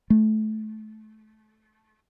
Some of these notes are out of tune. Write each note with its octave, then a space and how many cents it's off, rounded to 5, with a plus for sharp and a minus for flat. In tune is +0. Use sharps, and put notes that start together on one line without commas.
A3 -25